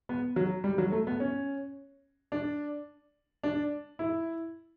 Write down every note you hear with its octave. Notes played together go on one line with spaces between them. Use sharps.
B3
F#3
G3
F#3
A3
B3
C#4
D4
D4
E4